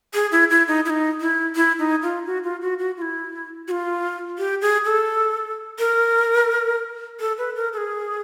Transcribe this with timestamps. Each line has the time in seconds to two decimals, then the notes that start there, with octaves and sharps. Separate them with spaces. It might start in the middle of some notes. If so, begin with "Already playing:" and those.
0.14 G#4
0.32 E4
0.50 E4
0.68 D#4
0.85 E4
0.90 D#4
1.21 E4
1.56 E4
1.79 D#4
2.02 F4
2.26 F#4
2.44 F4
2.62 F#4
2.79 F#4
2.97 F4
3.02 E4
3.68 F#4
3.71 F4
4.38 G4
4.62 G#4
4.85 A4
5.79 A#4
7.20 A4
7.38 B4
7.56 A#4
7.73 A4
7.77 G#4